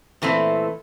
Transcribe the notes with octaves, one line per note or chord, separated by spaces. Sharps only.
A#2 E3 A3 C4